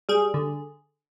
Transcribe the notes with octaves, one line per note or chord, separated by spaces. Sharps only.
G3 G#4
D3